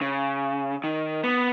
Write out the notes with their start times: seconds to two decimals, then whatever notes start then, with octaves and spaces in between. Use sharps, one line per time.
0.01 C#3
0.84 D#3
1.24 B3